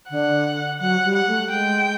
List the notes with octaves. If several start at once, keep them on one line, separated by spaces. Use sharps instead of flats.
D3 F#5
F#3 F#5
G3
F#5
A3
G#3 G5